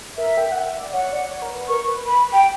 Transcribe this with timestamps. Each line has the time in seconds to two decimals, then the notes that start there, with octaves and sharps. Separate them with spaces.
0.17 A#4 E5
0.37 G5
0.52 F#5
0.65 E5
0.79 D5
0.93 C#5 F#5
1.13 D5
1.31 C#5
1.42 A#4
1.50 B4
1.68 A#4 C#6
1.88 B4
2.06 B5
2.33 G5